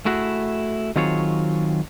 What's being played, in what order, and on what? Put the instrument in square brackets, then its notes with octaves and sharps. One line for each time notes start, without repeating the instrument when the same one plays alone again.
[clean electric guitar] A3 E4 F#4 G#4
D#3 F#3 C4 F4 G#4 C#5